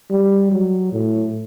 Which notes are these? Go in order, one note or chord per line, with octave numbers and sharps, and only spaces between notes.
G3
F#3
A2